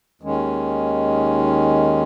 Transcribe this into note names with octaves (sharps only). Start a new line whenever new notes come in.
D#2 D#3 G#3 C#4